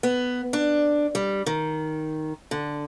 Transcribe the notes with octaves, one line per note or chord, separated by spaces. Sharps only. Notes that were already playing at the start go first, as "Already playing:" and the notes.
B3
D4
G3
D#3
D3